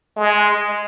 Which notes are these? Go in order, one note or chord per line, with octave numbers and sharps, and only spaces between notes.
G#3